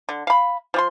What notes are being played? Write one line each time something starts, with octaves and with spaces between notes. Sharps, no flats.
D3
F5 B5
F3 G4 C6